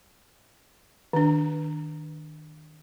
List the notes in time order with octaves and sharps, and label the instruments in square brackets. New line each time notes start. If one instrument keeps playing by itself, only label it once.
[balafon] D#3 D4